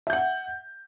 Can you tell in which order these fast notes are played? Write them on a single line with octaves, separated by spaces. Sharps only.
E5 G6 F#5